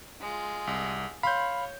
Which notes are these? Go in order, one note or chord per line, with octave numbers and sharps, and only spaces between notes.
G#3 F4
C2
C#5 F5 B5 C6 G6